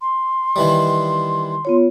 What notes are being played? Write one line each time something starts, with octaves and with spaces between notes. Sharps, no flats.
C6
D#3 E3 G3
B3 F4 C#5